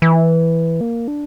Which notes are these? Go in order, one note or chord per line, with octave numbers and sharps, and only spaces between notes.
E3
A#3
D4